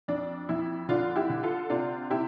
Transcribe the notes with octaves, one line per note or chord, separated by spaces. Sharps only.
F2 D4
F2 E4
D3 D4 F4
E4 G4
D3
F4 A4
C3 D4 F4
C3 E4 G4